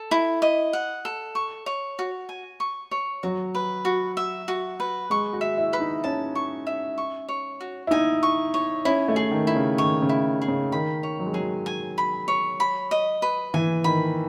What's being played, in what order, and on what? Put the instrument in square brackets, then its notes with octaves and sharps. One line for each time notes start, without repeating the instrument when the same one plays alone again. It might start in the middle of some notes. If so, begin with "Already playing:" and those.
Already playing: [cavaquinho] A4
E4
D#5
F#5
A4
C#6
C#5
F#4
G#5
C#6
C#5
[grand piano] F#3 [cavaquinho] F#4
[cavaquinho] B4
F#4
E5
F#4
B4
[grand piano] G#3 [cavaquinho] C#6
[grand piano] F#4
[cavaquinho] E5
[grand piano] E4
[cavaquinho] B4
[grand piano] D#4
[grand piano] C#4 [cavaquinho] A5
[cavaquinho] C#6
E5
C#6
C#5
F#4
[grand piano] E4
[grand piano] D#4 [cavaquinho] G#5
[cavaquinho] C#6
C#5
[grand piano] C#4 [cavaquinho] E4
[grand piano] A3
[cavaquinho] G#4
[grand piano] D#3
[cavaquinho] E4
[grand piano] C#3
[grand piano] D#3 [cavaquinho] C#5
[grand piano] C#3
[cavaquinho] E4
G#4
[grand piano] C#3
[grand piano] D#3 [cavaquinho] B5
[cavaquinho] C#5
[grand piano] F#3
G#3
[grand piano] F#3 [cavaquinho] G#4
[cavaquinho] G#5
B5
C#5
B5
D#5
B4
[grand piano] E3 [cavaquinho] G#5
[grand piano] D#3 [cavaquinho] B5